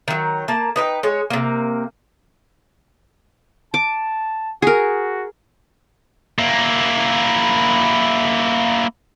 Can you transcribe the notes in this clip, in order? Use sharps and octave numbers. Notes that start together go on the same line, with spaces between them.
D#3 F#3
A#3 A5
D#4 B4 G5
G#3 C#5
C3 A#3
A5 D6
F#4 G#4 A#4
A#3 E4